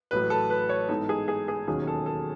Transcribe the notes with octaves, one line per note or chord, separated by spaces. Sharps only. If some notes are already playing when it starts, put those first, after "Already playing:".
A1 A2 F#3 B4
A4
B4
C#5
G#2 E3 B3 D#4 A4
G#4
G#4
G#4
E1 D#2 D#3 F#3 C#4 G#4
A4
A4